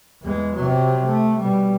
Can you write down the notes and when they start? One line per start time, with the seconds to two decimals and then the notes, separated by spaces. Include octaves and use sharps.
0.23 E2 G#3
0.55 C3 F#3
1.06 A3
1.38 B2 G3